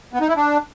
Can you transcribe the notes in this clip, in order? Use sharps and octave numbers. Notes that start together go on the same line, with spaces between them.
B3
D#4
E4
D4